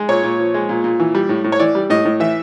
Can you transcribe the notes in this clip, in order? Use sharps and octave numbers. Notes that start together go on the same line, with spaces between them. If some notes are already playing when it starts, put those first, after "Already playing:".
Already playing: G#3
A#2 C#5
A#2
F3
G#3
A#2
A#2
E3
G3
A2
A2
C#5
E3 D5
G3
A2 D#5
A2
E3 E5